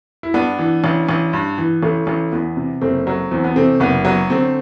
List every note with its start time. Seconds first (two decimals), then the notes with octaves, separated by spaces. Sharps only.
0.23 E4
0.34 G2 B3 D4
0.59 E3
0.84 A1
1.09 A1
1.33 G2
1.58 E3
1.83 A1 A3
2.07 A1
2.32 E2 B3
2.57 C3
2.81 F#1 A3 C4
3.07 F#3
3.31 E2 C4
3.44 B3
3.55 C3 A3 C4
3.80 F#1 B3
4.05 F#3 B3
4.30 D3 A3 C4